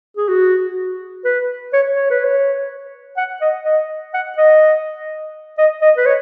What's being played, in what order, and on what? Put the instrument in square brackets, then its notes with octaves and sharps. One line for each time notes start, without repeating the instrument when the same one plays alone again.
[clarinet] G#4
F#4
B4
C#5
C#5
B4
C#5
F#5
D#5
D#5
F#5
D#5
D#5
D#5
B4
C#5